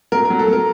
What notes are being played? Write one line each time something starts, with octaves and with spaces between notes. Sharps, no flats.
F#3 A#4
A#4
F#3
A4
F#3 A#4